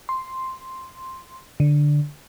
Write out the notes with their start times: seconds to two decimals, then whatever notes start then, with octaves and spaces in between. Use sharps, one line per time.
0.09 C6
1.60 D3